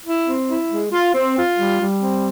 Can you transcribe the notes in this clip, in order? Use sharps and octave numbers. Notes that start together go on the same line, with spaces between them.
E4
C4
E4
G#3
F4
C4
F4
G3
G3
C4